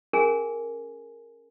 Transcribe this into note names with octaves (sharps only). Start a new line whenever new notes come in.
C#4 G#4 A#4 G#5